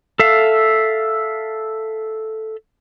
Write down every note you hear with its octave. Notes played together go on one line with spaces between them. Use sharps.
A4 E5 F5